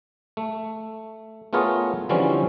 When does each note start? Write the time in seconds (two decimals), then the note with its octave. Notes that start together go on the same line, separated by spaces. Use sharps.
0.37 A3
1.53 A3 B3 F4 G#4 A#4 C#5
2.09 D3 E3 F3 G3 C4 C#4